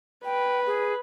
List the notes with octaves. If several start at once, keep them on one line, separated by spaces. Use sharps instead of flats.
B4 G5
G#4